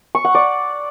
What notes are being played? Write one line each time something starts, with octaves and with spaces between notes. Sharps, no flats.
C#6
F#5
D5